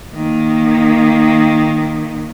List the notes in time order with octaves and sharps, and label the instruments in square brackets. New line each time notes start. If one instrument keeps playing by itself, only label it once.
[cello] D#3 A#3